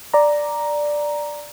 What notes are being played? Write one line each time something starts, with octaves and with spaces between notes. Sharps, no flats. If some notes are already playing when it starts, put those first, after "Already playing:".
D5 A#5